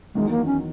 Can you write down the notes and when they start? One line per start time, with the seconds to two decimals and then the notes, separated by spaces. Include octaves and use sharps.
0.15 E2 D#3 F#3 G#3
0.30 A#3
0.46 C#4